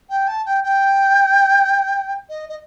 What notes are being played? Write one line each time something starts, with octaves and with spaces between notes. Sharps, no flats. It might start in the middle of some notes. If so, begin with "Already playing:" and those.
G5
A5
G5
G5
D#5
D#5